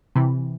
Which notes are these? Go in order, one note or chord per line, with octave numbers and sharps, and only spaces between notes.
C3 E3